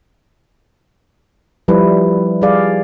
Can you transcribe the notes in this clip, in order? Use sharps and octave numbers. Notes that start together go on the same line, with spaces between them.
F3 G3 E4 B4
G3 G#4 D5 F5